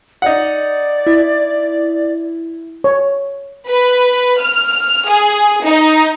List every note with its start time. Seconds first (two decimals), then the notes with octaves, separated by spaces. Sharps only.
0.22 D#4 D5 F#5
1.07 E4
2.84 C#5
3.69 B4
4.42 F6
5.09 G#4
5.65 D#4